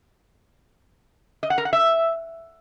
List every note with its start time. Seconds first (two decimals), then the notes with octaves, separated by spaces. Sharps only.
1.43 D#5
1.50 F#5
1.58 A#4
1.65 F#5
1.73 E5